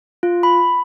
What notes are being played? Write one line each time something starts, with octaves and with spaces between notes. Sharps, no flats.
F4
B5